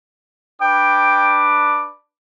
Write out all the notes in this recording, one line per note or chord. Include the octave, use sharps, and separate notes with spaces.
D4 B4 G5 D6